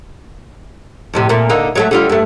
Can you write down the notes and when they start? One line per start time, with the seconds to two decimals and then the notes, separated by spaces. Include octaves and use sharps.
1.13 F2 A2 C3
1.29 A#2 A3
1.49 D3 A#3 D#4
1.75 F#3 G#3 A3
1.91 D3 G3 F4
2.09 G2 A3